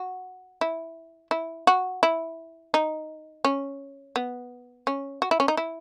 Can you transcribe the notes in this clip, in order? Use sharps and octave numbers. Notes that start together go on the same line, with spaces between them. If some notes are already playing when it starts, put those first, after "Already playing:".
Already playing: F#4
E4
E4
F#4
E4
D#4
C#4
B3
C#4
F#4
E4
C#4
D#4
E4